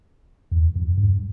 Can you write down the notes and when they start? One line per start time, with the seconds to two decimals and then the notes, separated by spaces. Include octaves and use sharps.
0.51 E2
0.76 F2
0.98 G2